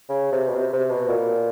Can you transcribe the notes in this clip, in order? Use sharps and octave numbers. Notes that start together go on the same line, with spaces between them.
C#3
C3
B2
C3
C3
B2
A#2